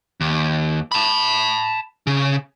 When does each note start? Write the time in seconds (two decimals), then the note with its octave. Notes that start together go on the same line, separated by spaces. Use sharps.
0.21 D#2
0.92 A5 B5
2.07 C#3